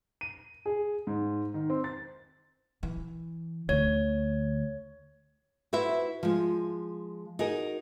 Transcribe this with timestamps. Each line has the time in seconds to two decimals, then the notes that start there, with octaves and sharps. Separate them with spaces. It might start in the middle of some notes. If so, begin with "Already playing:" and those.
0.21 D#7
0.66 G#4
1.07 G#2
1.54 D#3
1.70 C4
1.84 A6
2.83 E3
3.69 D2 C#5
5.73 E4 F#4 B4 C5 E5
6.23 F3 G#3
7.39 D#4 F#4 G#4 A#4